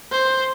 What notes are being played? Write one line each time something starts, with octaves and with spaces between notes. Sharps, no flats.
C5